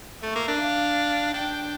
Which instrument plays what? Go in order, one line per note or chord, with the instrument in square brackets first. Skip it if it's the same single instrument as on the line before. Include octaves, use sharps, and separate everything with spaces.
[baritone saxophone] A3 [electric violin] E5
[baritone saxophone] A#3
D4
[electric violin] F5
[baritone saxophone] D4 [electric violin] G5